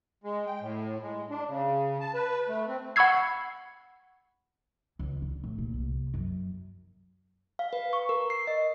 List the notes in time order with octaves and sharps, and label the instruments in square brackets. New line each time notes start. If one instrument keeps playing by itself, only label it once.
[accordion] G#3
G5
A2
G#3
D4
C#3
A5
B4
A3
C4
[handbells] F#5 B5 C#6 E6 G#6 C7
[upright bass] C#2
D3
A2
A#2
C2
F#2
[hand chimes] F5
B4
C#6
A#4
C7
D#5